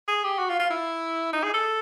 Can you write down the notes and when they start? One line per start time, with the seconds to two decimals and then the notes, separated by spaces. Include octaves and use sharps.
0.08 G#4
0.24 G4
0.39 F#4
0.49 F4
0.60 F4
0.70 E4
1.33 D#4
1.43 G#4
1.54 A4